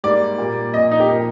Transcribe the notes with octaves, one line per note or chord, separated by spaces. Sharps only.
G#2 G3 A#3 D5
A#2 G3 A#3
A#2 F3 A#3 D#5
D#4
G4
A#2 F3 A#3 A#4